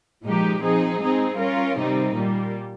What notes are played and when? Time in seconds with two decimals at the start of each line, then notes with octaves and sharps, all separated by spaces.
0.23 A#2 F3 G#3 D#4 G4
0.62 F3 C4 D#4 G#4
1.00 G#3 C4 D#4 G#4
1.38 G3 C#4 F4 A#4
1.76 C3 D#3 G3 C4 D#4
2.15 A#2 G3 A#3